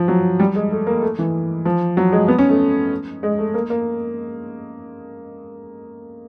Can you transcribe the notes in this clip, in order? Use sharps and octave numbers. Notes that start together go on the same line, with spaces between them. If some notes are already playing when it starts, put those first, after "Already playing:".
Already playing: F3
F#3
G3
G#3
A3
A#3
A3
E3
F3
F#3
G#3
B3
C#4
A3
G#3
A3
A#3
A#3